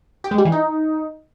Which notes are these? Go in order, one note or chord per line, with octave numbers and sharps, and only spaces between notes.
G4
G#3
G3
E3
D#4